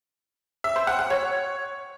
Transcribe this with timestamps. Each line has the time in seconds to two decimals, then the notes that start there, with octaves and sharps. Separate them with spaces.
0.64 E5
0.76 C5
0.87 F#5
0.99 F#5
1.10 C#5